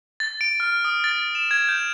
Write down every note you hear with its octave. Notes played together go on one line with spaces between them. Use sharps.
A6
D7
F6
D#6
A6
E7
G#6
G6